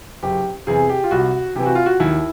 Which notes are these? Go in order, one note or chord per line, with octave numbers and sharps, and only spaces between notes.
F#1 G4
E2 C3 G#4
G4
F4
C2 F#4
C3 E3 G4
F#4
F4
F#4
D#2 E4